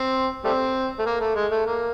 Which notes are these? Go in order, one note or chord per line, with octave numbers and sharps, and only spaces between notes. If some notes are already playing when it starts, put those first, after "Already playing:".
Already playing: C4
G3 A3 C4
A3
A#3
A3
G#3
A3
A#3